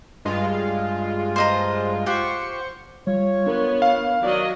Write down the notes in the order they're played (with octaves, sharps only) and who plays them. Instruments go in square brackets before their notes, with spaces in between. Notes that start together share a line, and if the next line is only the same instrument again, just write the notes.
[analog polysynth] G2 G#3 F4
[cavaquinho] C5 D#5 A#5
[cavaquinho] F4 G4 F#5 [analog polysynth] C5 C#6
[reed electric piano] G3 [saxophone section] F4 C#5
[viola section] B3 [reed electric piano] D4 A#4
[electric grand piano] F5
[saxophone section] D#3 A#4 D5 [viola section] F#3 D#5